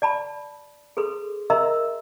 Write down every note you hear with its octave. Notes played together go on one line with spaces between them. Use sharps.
D5 A5 B5
G#4 A4 B4 C6
A#4 D#5 E5 A#5 C6 E6